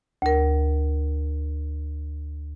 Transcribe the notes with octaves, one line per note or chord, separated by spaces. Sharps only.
D2 A#4